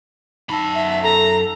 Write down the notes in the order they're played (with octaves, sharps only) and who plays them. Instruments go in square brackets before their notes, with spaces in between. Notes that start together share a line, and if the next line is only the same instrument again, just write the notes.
[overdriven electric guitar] F#2 B5 [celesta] D#4 A5 E6
[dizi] E5
[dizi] A4 [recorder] A#5